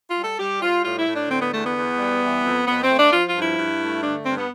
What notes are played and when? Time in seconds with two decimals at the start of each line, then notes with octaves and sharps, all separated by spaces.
0.09 F4
0.16 G3
0.24 A4
0.39 G3 G4
0.61 G3 F4
0.84 A2 F4
0.99 E4
1.07 A2
1.15 D4
1.30 D3 C4
1.41 B3
1.52 E2 A3
1.64 B3
1.75 E2
1.99 G3
2.20 E3
2.43 F2
2.66 F2 B3
2.82 C4
2.90 A3
2.97 D4
3.12 F3 F4
3.27 F4
3.34 G2
3.42 E4
3.58 G2
3.80 A3
4.03 D3 D4
4.25 G2 C4
4.38 B3